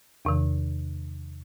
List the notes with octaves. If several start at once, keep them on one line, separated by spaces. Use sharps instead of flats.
E2 C3 D#3